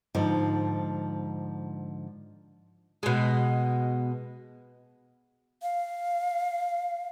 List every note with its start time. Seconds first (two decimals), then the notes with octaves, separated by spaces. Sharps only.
0.15 G#2 D3 F3
3.03 B2 G#3
5.63 F5